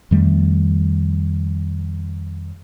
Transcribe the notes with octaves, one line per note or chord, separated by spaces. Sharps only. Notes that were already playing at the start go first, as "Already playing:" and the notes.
F2 D#3 G3 A3